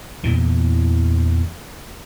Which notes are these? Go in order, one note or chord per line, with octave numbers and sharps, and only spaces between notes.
E2 A#2 E3